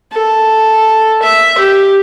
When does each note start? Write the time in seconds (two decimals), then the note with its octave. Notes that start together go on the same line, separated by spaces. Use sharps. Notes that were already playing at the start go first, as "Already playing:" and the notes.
0.12 A4
1.22 E5
1.58 G4